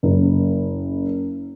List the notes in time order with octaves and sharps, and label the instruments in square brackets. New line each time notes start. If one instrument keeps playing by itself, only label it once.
[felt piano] F#1